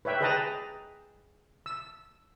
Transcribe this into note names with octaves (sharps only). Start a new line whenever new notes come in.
B4 C#5 E5 G5
G#4 B4 D#5 G5 A5 A#5
E6